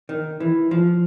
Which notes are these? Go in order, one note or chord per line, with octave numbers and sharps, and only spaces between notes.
D#3
E3
F3